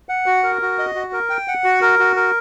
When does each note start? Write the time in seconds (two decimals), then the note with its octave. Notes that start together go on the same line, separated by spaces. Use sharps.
0.09 F#5
0.26 F#4
0.43 A#4
0.62 F#4
0.79 D#5
0.95 F#4
1.13 A#4
1.30 G5
1.48 F#5
1.64 F#4
1.82 A#4
1.99 F#4
2.16 A#4